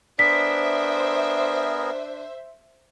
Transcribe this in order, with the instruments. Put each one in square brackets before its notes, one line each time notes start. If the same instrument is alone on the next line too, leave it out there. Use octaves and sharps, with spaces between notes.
[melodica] B3 G#4 A#4 [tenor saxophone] D4 [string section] C5 E5 [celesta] B6